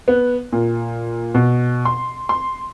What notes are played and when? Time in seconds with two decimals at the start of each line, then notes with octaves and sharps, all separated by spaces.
0.08 B3
0.53 A#2
1.34 B2
1.85 C6
2.29 C6